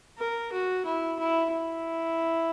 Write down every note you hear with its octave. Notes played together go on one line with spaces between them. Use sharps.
A#4
F#4
E4
E4
E4